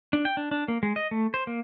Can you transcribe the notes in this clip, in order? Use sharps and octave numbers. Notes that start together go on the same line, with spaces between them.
D4
G5
D4
D4
A#3
G#3
D#5
A3
C5
A#3